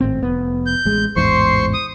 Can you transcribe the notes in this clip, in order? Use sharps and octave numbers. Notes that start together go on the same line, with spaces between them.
G#1 A2 C4
F1 B3
G6
A1 G#3
A1 E2 G#2 C5 C6 C#6
D#6